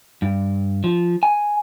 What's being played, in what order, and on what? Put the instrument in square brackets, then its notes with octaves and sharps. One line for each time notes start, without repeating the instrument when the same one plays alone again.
[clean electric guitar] G2
F3
G#5